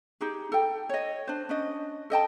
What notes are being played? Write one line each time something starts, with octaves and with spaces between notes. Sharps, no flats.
D#4 G4 G#4
A4 G5
C#5 D#5
D4 C5
C#4 D4 D#5
A4 D#5 G5 A5